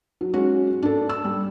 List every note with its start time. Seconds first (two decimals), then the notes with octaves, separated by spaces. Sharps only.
0.21 F#3
0.34 G#3 C#4 F#4
0.83 D4 A4
1.09 E6
1.25 G3